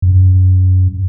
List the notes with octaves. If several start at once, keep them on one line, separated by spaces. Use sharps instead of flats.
F#2